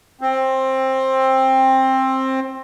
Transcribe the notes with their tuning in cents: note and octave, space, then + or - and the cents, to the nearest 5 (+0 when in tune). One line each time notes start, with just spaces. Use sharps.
C4 +15